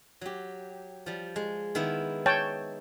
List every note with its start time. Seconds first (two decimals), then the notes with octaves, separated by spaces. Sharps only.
0.21 F#3 G4
1.06 F3 G3
1.36 G#3
1.75 D#3 B3 E4
2.26 C#5 G5 A5